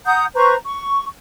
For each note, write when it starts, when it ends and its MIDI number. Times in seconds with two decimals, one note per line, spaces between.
0.06 0.25 78
0.06 0.25 82
0.06 0.25 87
0.06 0.25 91
0.35 0.55 71
0.35 0.55 72
0.35 0.55 82
0.35 0.55 85
0.64 1.07 85